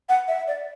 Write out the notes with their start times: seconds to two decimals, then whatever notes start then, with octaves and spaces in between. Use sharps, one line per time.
0.09 F#5
0.28 E5
0.47 D5